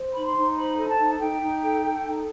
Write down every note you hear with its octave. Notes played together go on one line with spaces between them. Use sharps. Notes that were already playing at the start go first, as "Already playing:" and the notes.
Already playing: C5
D#4 B5
C6
D#4
C5 B5
A4
A5
D#4
D#4 G5
D#4
A4
A4
D#4